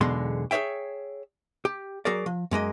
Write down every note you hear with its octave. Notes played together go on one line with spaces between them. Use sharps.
B1 E2 B2 D3 G#3 C6
G#4 B4 C#5 E5 G5
G4
F#3 F#4 G#4 A#4 D5
F3
F#2 G#3 A#3 D#5